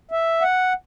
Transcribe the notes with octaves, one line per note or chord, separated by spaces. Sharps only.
E5
F#5